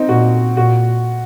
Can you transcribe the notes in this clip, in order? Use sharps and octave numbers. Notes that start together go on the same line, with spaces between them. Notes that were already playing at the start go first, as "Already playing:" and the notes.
Already playing: C4 D#4
A#2 F#4
A#2 F#4